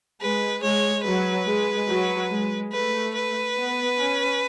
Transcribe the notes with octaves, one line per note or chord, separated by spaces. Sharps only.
G#3 B4
G#3 C#5
F#3 B4
G#3
F#3
G#3
A3 B4
B4
B3
C#4